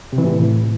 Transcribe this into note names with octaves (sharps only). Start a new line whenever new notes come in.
C3
E3
A2